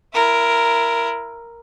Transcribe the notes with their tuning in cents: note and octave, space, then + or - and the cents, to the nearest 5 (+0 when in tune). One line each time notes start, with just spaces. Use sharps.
E4 +25 A#4 +0